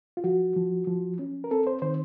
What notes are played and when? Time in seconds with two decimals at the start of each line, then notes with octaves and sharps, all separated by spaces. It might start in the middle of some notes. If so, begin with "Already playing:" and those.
0.17 F4
0.24 F3 F#4
0.56 F3
0.87 F3
1.19 C#4
1.44 A#4
1.51 C4 A4
1.67 C5
1.82 D#3 C5